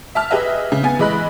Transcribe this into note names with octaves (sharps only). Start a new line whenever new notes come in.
E5 A5 F6
G4 G#4 B4 D#5 E5
C#3
B3 G#5 A6
E3 G#3 D#5 B5 F#6